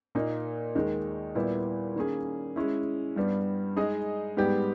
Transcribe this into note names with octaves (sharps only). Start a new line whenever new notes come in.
A#2 A#3 D#4
D#2 D#3 G#3 D#4
A#2 G3 B3 E4
D#3 A#3 C#4 G#4
G#3 C#4 E4
G2 G3 B3
G#3 D#4 G#4 D#5
G#2 G3 B3 G4